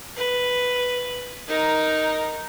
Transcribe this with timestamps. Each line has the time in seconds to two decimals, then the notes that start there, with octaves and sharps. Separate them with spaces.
0.17 B4
1.48 D#4 A#4